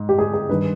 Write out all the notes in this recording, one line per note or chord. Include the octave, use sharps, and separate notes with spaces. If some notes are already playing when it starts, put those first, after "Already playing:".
Already playing: G#2
G4
G#4
G#4
G2 D#3 B4